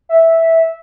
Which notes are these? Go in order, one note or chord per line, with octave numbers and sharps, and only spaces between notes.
E5